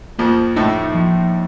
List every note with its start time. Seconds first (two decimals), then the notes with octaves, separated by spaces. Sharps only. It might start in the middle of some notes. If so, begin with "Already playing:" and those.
0.19 F2 F3 A#3
0.56 A2 A3 D#4
0.95 F3